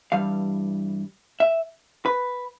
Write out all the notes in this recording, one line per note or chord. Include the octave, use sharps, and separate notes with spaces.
G2 E3 G3 F5
E5
B4